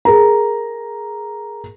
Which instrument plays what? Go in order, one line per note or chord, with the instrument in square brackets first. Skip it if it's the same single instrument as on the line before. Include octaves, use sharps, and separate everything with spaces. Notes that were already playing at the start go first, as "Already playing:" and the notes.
[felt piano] G#4 A#4 A#5